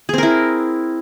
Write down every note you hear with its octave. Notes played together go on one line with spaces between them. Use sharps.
C4 E4 G#4 A#4